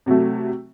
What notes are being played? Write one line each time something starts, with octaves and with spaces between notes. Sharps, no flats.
C3 F#3 A3